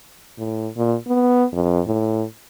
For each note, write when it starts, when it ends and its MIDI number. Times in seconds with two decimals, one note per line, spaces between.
0.38 0.68 45
0.77 0.96 46
1.08 1.44 59
1.53 1.80 41
1.86 2.24 45